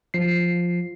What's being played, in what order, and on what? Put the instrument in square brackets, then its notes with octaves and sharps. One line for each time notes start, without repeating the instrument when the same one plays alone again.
[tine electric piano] F3 C7